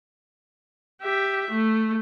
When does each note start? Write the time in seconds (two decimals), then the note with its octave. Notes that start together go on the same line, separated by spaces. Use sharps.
1.02 G4 E5
1.51 A3